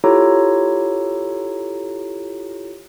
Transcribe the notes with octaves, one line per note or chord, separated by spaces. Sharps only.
E4 F4 G4 A4 C#5 A#5